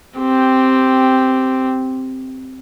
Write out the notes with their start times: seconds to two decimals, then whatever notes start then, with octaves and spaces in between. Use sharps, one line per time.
0.18 C4 G4